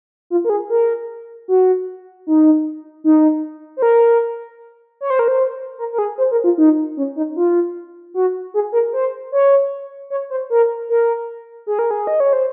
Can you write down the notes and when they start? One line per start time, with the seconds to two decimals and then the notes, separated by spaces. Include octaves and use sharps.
0.30 F4
0.45 A#4
0.50 G#4
0.70 A#4
1.48 F#4
2.27 D#4
3.04 D#4
3.77 C5
3.82 A#4
5.01 C#5
5.10 C5
5.19 A#4
5.28 C5
5.78 A#4
5.93 A#4
5.98 G#4
6.18 C5
6.31 A#4
6.44 F4
6.58 D#4
6.97 C#4
7.16 D#4
7.36 F4
8.14 F#4
8.54 G#4
8.72 A#4
8.93 C5
9.32 C#5
10.10 C#5
10.30 C5
10.50 A#4
10.89 A#4
11.67 G#4
11.79 A#4
11.91 G#4
12.07 D#5
12.20 C#5
12.33 C5